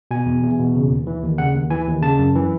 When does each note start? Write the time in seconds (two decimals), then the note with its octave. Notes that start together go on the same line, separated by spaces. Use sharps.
0.11 B2 G#5
0.26 E2
0.43 E2
0.59 B2
0.75 C#3
0.91 D#2
1.07 E3
1.23 D#2
1.38 C#3 F#5
1.54 D#2
1.70 E3 G#5
1.87 D#2
2.02 C#3 A5
2.19 F#2
2.35 E3